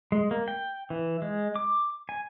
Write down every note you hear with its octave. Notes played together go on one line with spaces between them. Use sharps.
G#3
A#3
G5
E3
G#3
D6
G#5